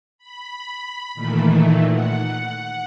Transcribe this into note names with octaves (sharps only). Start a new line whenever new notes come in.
B5
A#2 D#3 E3 A3
F#5